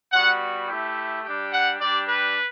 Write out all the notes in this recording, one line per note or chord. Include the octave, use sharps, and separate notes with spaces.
G3 B3 F#4 F#5
A3 E4 G4
G3 D4 G4
F#5
G3 D4 G4 D5
B4